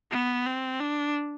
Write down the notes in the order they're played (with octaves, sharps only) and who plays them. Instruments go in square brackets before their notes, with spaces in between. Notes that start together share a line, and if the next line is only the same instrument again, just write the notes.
[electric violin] B3
C4
D4